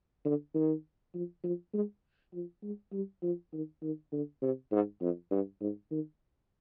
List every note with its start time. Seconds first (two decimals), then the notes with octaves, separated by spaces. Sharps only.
0.25 D3
0.54 D#3
1.14 F3
1.43 F3
1.74 G#3
2.34 F3
2.63 G#3
2.93 G3
3.22 F3
3.53 D#3
3.82 D#3
4.12 D3
4.42 C3
4.71 G#2
5.01 F2
5.31 G2
5.61 G#2
5.91 D#3